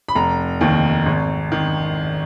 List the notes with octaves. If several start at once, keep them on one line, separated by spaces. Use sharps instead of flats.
B5
F1 A#5
D#2 D#3
G#1
D#3